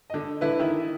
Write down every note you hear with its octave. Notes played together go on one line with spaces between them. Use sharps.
D3 D#5
D3 E4 B4
D#3 E4